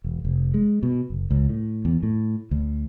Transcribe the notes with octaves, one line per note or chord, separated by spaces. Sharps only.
E1
F1
G#3
B2
F#1
C#2
A2
E2
A2
D2